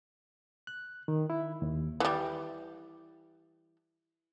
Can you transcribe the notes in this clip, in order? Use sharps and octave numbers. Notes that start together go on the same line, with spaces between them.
F#6
D#3
E4
D#2
E3 G3